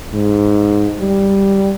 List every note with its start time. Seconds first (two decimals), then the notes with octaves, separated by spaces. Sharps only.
0.13 G#2
1.00 G3